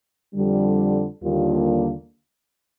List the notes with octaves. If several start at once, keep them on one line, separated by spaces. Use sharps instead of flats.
F2 D3 G3
D#2 D3 G3 A#3 F4